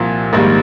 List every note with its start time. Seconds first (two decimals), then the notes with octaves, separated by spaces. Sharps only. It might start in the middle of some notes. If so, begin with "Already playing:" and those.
Already playing: C2 A#2 F3
0.33 A#1 G#2 D#3 G3 A#3